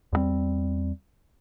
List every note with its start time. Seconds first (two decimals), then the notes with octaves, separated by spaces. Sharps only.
0.13 E2 G2 G3 C4